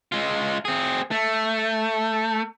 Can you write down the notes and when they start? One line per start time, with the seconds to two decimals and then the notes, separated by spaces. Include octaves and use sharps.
0.12 G#3 F4
0.65 C4 G#4
1.11 A3